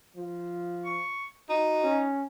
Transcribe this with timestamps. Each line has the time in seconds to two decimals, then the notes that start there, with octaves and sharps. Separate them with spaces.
0.16 F3
0.85 C#6
1.49 D#4 F#4
1.83 C#4